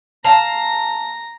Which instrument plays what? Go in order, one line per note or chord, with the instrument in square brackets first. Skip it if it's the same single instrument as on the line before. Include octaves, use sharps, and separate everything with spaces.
[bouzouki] F5 A5 [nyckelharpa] A#5